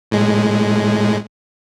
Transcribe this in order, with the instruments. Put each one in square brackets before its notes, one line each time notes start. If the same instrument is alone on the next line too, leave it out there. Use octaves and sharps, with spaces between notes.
[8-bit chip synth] A2 G#3